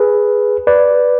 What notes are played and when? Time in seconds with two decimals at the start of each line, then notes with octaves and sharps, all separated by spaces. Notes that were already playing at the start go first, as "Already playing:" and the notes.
Already playing: G#4 B4
0.67 B4 D5